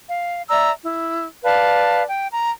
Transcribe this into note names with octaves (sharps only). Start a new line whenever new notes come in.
F5
D5 E5 A#5 E6
E4
B4 D5 F5 A5
G5
A#5